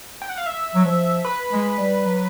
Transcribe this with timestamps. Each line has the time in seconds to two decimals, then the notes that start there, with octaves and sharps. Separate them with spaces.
0.22 G5
0.29 F#5
0.38 F5
0.46 E5
0.75 F#3
0.85 F3
1.25 B4
1.52 G#3
1.78 G3
2.05 F#3